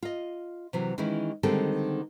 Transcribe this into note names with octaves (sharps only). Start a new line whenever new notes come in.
F4 D#5
C3 E3 F#3
D#3 E3 G#3 C#4 E4
D3 D#3 G3 G#3 C4 A4